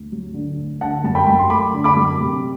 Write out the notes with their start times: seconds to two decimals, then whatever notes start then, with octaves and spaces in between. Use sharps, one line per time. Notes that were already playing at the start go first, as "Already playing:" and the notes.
Already playing: D2
0.12 F#3
0.34 D3
0.57 D2
0.81 D3 F#5 A5
1.04 F#2 A5
1.15 G5 B5
1.27 F#2 B5
1.39 C6
1.50 A3 B5 D6
1.74 D3
1.84 B5 D6
1.96 F#2
2.20 C3